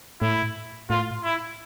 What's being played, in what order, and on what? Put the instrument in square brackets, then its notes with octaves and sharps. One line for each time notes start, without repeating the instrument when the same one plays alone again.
[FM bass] A2 [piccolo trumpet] E4
[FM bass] A2 [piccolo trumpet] F4
[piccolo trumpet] E4